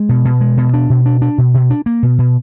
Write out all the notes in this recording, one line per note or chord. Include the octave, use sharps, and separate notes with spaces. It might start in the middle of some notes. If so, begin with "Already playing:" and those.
Already playing: G#3
B2
B2
G#3
B2
D4
B2
D4
D4
B2
B2
D4
A#3
B2
B2